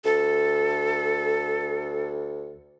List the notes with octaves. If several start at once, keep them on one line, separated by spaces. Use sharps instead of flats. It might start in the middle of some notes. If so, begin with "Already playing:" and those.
D2 A4